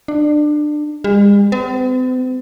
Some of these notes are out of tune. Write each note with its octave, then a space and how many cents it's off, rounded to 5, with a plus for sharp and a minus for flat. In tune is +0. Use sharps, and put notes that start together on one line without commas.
D4 +25
G#3 -45
C4 -45